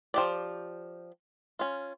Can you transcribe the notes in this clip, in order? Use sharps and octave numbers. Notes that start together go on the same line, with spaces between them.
F3 G4 D5
C#4 F4